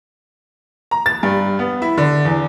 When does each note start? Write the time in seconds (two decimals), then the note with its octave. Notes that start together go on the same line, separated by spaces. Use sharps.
0.91 A#5
1.06 A6
1.23 G2
1.59 B3
1.82 E4
1.97 D3
2.25 E2